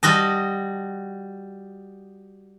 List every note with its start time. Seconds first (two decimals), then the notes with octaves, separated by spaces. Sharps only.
0.03 G3 F#4 D#5 A5